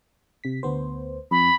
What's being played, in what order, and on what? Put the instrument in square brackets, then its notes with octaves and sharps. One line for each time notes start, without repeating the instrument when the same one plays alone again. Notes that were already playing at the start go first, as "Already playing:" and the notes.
[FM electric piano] C3 B6
D2 B3 C5
[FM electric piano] F2 [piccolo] B5